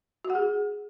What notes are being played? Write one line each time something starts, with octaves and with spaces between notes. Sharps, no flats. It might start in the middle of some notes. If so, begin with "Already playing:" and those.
F#4
F#5
G#4